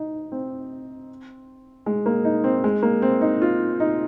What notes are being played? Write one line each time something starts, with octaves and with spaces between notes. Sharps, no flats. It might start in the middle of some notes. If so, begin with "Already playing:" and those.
Already playing: D#4
C4
G#3
A#3
D#4
C4
G#3
A#3
C4
D#4
F4
D#4